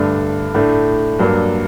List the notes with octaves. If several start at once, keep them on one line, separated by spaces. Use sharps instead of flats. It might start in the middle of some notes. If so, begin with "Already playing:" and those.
Already playing: G2 D3 A3 D4
A2 A3 D4
G2 F#3 A#3 D4